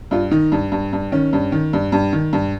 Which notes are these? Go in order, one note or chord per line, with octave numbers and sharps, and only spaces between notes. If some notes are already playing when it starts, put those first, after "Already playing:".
G2 F4
D#3 D#4
G2
G2
G2
D#3 C#4
G2
D#3
G2
G2
D#3
G2